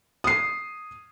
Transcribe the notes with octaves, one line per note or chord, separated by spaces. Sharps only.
D#6 C7